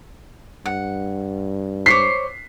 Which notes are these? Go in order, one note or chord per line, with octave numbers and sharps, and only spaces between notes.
G2 F#5
C5 C#5 D6 B6 C7